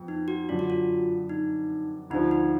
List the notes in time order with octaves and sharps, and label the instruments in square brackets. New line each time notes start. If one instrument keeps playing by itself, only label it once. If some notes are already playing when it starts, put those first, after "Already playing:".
Already playing: [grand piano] F2 B3
[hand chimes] D#4
F#4
[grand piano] F#2 D3 F#3 D4 [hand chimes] F4
[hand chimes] F#4
F4
D#4
[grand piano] D2 D3 F3 [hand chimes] D#4
[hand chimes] D#4